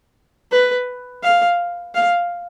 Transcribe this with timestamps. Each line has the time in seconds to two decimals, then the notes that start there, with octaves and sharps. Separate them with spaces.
0.51 B4
1.23 F5
1.95 F5